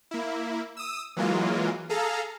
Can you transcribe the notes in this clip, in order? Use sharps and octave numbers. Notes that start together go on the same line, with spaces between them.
A#3 E4
D#6 E6
E3 F#3 G#3 A#3 F4
G#4 A4 F5 A#5